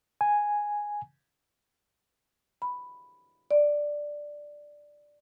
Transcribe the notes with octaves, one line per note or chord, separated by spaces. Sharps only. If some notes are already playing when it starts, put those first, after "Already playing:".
G#5
B5
D5